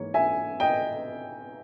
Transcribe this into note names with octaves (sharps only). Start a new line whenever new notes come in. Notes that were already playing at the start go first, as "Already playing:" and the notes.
Already playing: G#2 E3 A#3 C#5
E5 G#5
D#5 G5